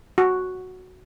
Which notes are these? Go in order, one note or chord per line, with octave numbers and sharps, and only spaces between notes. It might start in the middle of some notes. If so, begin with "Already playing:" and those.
F#4